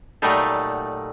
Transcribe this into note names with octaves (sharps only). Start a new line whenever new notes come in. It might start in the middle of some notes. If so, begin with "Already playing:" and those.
A#2 F#3 G3 A3 D#4 A4